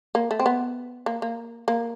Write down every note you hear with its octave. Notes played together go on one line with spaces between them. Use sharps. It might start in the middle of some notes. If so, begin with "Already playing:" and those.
A#3
A3
C4
B3
A#3
A#3
A#3